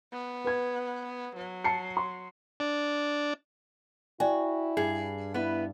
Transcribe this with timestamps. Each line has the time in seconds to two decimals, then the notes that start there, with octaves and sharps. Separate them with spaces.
0.13 B3
0.45 B4 G#6
1.36 F#3
1.64 A5 C7 C#7
1.97 C6
2.60 D4
4.20 E4 F#4 D5 G5 G#5
4.77 G2 G#4
5.34 B3 E4 B4